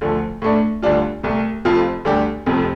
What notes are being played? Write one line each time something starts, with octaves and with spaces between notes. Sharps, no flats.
D2 D3 F3 A3
A2 A3 D4
D2 D3 G3 D4 F4
C2 C3 A3
F1 F2 F3 C4 F4
D2 D3 G3 D4 G4
F1 F2 C3 F3